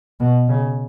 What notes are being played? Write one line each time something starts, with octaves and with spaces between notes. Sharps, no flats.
B2
C#3